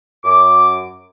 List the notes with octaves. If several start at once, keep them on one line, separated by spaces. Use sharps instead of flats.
F#2 D6